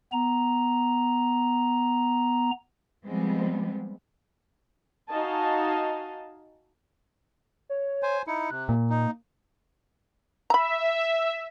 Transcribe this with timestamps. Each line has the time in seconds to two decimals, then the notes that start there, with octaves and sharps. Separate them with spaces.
0.12 B3 A#5
3.05 F3 G3 G#3 B3 C4
5.09 D#4 F#4 D#5 F5 G#5 A5
7.69 C#5
8.03 C5 G#5
8.27 D#4 E4 C#7
8.51 C3 F#6
8.69 A#2 A#3
8.90 D#4
10.50 E5 A#5 B5